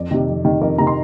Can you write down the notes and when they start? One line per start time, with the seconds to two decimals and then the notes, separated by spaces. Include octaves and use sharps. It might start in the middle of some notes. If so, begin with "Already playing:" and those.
Already playing: F2 D5
0.11 C3 D#3
0.28 F2
0.45 C3 D#3
0.62 F2 A#4
0.78 C3 D#3 A#5
0.87 C6